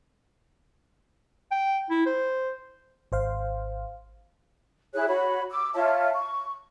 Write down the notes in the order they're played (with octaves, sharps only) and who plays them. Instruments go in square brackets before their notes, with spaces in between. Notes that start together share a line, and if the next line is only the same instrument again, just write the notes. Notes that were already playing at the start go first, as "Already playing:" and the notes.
[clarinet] G5
E4
C5
[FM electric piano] G#1 C5 F5
[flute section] E4 G#4 C#5 F#6
F#4 C#5 B5
D6 E6
F4 C#5 E5 A5
C#6